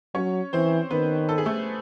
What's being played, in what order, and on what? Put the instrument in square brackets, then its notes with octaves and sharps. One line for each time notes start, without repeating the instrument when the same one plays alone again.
[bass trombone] F#3 [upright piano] C#4 C#5
[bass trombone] E3 [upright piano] C4 C5
[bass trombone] D#3 [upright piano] B3 B4
[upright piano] A4
G#4
A3 A4